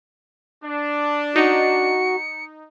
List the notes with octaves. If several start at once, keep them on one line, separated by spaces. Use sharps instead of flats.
D4
D#4 F#4 C#7